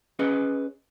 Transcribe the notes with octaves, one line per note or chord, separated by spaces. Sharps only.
C#4 G#4 B4 D#5